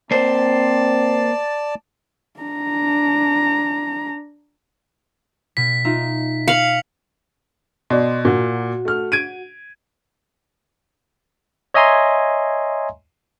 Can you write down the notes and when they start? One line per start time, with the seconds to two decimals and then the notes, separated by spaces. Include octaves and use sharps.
0.11 A#3 C4 C5 D5 A5
2.40 D4 A#5
5.57 B2 B6
5.85 D#4 F4 E5
6.48 F5 C#7 F7 F#7
7.90 B2 D5 C6
8.25 A#2 F#4 F#5
8.85 A3 F6
9.12 G#6 D7 D#7
11.74 C#5 D#5 E5 G#5 A#5 C6